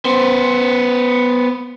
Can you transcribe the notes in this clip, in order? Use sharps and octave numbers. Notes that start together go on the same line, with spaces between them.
B3 C5